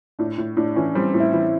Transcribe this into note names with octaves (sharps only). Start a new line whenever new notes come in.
A2 D4
A2
A2 D4
E3 C#4
G3 C4
A2
E4
E3